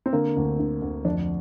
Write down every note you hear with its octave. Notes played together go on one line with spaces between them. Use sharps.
C4
D3 A#3
D2
D3
D2
F2 D4